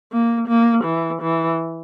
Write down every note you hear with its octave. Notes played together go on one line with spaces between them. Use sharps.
A#3
A#3
E3
E3